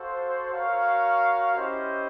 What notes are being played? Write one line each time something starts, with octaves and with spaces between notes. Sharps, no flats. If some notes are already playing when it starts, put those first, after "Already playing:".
Already playing: F#4 A4 C5 F5
F#4 A#4 C#5 F5
C#4 E4 G4 C5 D#5